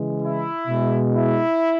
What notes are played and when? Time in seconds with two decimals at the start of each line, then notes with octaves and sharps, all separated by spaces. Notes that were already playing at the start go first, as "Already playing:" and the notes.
Already playing: C#3 E3 G#3
0.21 E4
0.67 B2 G#3
1.14 E4